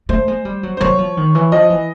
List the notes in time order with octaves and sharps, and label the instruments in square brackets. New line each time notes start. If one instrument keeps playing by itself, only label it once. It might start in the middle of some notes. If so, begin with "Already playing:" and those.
[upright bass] A3 [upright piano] C5
[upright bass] G#3
G3
F#3
[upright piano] C5
[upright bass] F#3 [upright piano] C#5
[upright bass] F3
D#3
E3
[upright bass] F3 [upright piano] D#5
[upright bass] E3